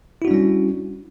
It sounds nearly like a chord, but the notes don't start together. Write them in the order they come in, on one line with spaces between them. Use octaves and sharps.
E4 F#4 D4 G3 C#4